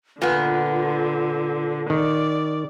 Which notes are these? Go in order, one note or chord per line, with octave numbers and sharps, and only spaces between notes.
A#2 D3 B3 F4
D#3 D5